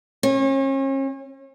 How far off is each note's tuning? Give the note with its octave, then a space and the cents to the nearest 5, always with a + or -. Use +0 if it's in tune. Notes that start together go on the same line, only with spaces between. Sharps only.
C#4 -40